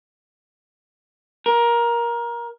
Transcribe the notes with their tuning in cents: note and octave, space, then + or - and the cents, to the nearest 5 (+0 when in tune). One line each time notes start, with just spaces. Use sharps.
A#4 +20